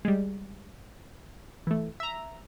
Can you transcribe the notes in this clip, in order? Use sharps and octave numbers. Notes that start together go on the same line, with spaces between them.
G3 G#3
E3 A3
E5 A#5